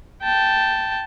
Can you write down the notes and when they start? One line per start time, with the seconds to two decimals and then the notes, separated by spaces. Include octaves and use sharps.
0.23 G5 A5